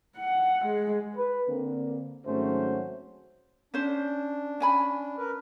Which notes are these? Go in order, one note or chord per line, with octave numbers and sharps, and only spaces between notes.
F#5
G#3
B4
D3 A#3 C4
G#1 F#3 A3 C#4 F#4 C5
C#4 D4 C5
C#4 G#5 B5
A#4 B4